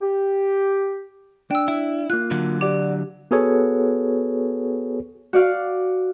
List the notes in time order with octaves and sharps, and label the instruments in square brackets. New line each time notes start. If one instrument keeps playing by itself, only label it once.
[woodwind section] G4
[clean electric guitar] D4 [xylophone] G5 E6
[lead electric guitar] E4
[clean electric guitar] A#3 F4 [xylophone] F#6
[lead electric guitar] D3 F#3
[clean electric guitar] F#4 D5 [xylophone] G4
[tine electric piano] B3 F#4 G#4 A4 B4 C#5
[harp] F#4 D5 F5